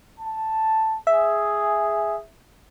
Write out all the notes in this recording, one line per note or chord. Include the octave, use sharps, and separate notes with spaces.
A5
G#4 E5